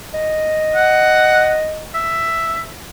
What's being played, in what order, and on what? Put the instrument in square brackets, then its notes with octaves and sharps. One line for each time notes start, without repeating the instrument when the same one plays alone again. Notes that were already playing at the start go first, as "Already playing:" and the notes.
[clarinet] D#5
[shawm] F#5
E5